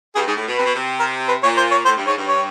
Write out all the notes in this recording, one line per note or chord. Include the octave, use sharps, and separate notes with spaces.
G2 G#4
G#2 G#4
A2
B2
C3 B4
B2
C3
A#4
B4
A#2 C#5
C5
C#5
A2 C5
G2
G#2 C#5
G2
C#5